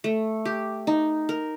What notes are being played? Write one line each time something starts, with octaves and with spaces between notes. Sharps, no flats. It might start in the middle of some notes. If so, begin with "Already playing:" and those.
A3
G4
D#4
A#4